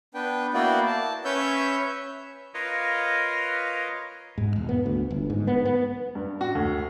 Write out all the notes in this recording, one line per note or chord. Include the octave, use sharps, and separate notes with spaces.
B3 D4 B4 G5
A#3 B3 E4 F#4 D5 G5
A5
C#4 B4 C#5 E5 E6 G6
F4 A#4 B4 C#5 D#5 F5
G#2
E1
B3
D2
G1
G#2
B3
B3
G2
F#4
D2